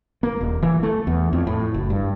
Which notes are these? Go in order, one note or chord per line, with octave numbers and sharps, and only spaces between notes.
A#3
D#1
E3
A3
E2
F2
A2
F#1
G2